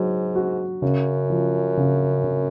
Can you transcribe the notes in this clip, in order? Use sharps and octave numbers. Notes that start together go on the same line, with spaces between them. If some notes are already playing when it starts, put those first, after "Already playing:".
Already playing: G#2 F#3
F#4
F#2 C#3
F3
C#3
C#3